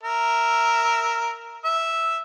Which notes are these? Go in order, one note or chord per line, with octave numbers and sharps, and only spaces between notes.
A#4 E5
E5